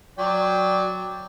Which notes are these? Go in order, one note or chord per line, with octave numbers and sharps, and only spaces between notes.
F#3 D5 G5